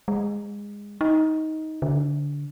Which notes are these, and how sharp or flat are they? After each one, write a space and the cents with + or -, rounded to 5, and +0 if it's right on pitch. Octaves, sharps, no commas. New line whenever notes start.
G#3 -20
D#4 +15
D3 -25